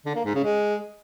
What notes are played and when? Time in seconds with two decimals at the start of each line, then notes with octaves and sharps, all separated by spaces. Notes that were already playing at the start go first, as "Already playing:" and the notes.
0.05 D3
0.15 A#3
0.25 G#2
0.34 C#3
0.44 G#3